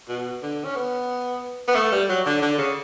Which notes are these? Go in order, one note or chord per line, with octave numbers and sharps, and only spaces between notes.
B2
D3
C#4
B3
B3
A3
G3
F#3
D3
D3
C#3